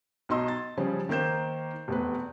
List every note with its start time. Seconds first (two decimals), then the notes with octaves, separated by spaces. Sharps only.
0.29 B1 D#4 D#5 C6 E6
0.48 A6
0.77 C#3 F3 G3 C#4
1.09 D#3 A#3 C5 G6 E7
1.88 F1 E2 B4